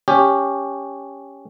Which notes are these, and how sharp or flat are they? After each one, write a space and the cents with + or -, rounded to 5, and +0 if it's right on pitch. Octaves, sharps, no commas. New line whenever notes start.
C#4 +5 G4 +10